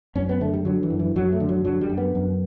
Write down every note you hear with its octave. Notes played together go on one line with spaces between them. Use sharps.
F#2 C#4
B3
D3 A3
G3
D3 F#3
E3
F#2
E3
F#2 F#3
A3
D3
F#3
D3 F#3
G3
F#2
B3
F#2